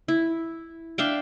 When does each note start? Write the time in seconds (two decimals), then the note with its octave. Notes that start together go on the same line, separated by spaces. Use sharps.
0.08 E4
0.98 D4 E5 F5 G5